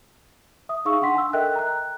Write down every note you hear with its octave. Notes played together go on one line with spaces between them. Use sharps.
E5 D#6
D#4 G#4 F5 C#6 E6
D4 F#5 C6 B6
G#5 E6
A4 A#4 D#5 E5 G5 F#6
A#5 F#6